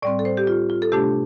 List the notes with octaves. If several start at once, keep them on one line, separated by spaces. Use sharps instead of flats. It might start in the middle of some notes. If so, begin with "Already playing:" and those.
A2 G3 C4 D5
A4
C5
G4
F4
F4
A4
C3 A3 D4 G4